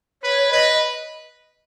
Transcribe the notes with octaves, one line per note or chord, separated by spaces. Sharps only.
B4 C#5
B4 D#5